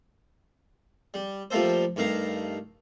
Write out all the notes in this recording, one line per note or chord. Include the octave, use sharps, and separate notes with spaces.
G3
F3 G3 A3 A#3 A4 C5
G2 D#3 A3 F5 A#5